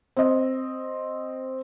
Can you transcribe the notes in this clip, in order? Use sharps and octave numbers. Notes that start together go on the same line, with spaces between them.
C4 D#5